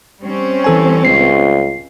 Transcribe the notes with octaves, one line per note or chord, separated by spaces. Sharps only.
G3 C4 C#4
E3 A4 G#5
C#2 C7